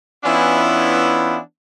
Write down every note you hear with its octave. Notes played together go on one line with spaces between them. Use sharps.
E3 B3 C#4 D4 E4 F4